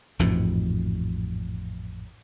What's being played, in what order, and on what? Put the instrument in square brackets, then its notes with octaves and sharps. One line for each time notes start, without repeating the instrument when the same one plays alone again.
[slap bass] A1 F2 G#2 B2